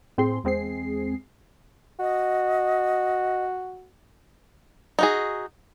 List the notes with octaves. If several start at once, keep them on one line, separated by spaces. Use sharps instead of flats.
A2 C4 G#4 C6
E2 G#3 C4 G#4 C7
F#4 D#5
D#4 F#4 G#4